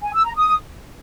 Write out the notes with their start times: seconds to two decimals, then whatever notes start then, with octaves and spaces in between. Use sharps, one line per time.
0.02 G#5
0.14 E6
0.25 A#5
0.36 D#6